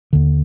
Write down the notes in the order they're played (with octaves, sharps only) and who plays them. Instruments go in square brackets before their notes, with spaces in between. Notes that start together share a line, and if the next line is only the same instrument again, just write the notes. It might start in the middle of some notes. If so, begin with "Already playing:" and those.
[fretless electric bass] D#2 D3